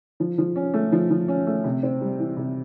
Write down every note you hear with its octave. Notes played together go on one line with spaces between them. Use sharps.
F3
F3
C#4
A3
F3
F3
C#4
A3
C3
C4
G3
E3
C3